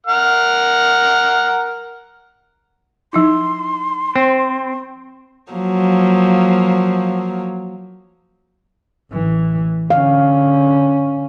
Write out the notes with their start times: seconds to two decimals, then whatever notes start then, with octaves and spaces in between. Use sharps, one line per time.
0.07 A#4 F#5 F6
3.13 F3 D#4 E4 C6
4.16 C4 C5
5.52 F3 F#3 A#3
9.12 A1 E3
9.90 D3 C#4 F5